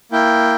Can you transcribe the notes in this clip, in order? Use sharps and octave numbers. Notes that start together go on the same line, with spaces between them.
A#3 E4 G5